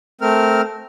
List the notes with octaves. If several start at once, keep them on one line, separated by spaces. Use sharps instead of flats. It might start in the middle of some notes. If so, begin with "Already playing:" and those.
A3 C4 A#4 F6